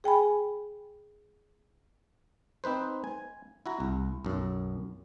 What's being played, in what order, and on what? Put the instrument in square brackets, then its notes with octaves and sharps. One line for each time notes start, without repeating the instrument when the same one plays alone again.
[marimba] G#4 G5 G#5 B5
[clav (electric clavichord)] C4 D#4 B4 C5
G#5
E4 F#4 A#5
C2
B1 F#2